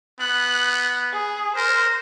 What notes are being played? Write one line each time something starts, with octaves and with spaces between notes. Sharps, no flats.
B3 F#6
G#4
A#4 C5